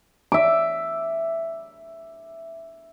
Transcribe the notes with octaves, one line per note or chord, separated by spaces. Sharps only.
E5 D6